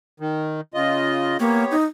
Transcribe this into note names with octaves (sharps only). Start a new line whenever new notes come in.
D#3
C#3 F4 D#5
A#3 B3 G4 C#5
D#4